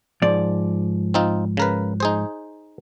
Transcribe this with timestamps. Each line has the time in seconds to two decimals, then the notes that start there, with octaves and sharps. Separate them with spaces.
0.22 G#2 F3 D5
1.14 C4 D#4 F4
1.57 C#3 A#4 B4
2.00 D#4 G#4 C5